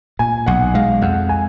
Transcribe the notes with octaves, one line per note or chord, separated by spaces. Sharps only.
A#2 G#5
B1 F#5
G#3 F5
F2 F#5
G#5